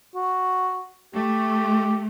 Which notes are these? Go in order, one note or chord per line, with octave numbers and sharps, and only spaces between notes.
F#4
A3 G4